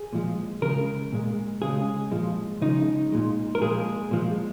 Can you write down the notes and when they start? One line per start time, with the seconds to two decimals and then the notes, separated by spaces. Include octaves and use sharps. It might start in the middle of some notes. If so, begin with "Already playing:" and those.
Already playing: G#4
0.13 A#2 F3 G#3
0.62 C#3 G#3 A#4
1.13 A#2 G#3
1.62 C#3 G#3 G#4
2.12 A#2 F3 G#3
2.62 C#3 F3 G#3 D#4
3.12 A#2 G#3
3.55 A#4
3.61 A#2 F3 G#3 G#4
4.11 A#2 F3 G#3